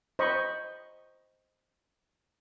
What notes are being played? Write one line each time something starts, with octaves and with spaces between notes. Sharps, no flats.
C5 D#5 B5 C#6